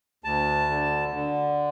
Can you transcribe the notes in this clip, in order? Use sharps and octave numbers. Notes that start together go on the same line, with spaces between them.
D2 A5
D3
D3